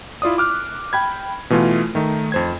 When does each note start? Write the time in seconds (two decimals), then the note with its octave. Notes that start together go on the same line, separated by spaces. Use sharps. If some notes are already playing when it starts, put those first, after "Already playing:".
0.22 E4 F4 D5 D#6
0.38 D6 F6 F#6
0.93 G5 B5 G#6
1.50 B2 E3 A3 F4
1.95 D#3 A3 D#4
2.32 F2 C5 G#6